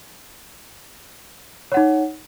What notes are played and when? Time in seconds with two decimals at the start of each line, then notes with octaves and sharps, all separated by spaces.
1.72 C#5
1.74 F#5
1.77 D#4